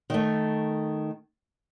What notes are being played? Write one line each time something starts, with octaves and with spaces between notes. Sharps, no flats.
D#3 A3